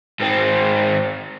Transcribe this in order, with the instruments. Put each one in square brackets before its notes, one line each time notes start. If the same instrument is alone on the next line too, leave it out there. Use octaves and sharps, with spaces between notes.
[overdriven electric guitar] G#2 C4